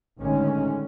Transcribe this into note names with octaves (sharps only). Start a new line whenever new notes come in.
A1 D3 D#3 G#3 C#4